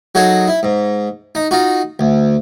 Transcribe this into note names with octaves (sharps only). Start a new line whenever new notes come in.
F#3 D#4 F#4 G#4 A4
E4
G#2
D#4
D#4 F4 F#4
D2